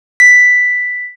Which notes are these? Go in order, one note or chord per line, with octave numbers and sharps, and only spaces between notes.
B6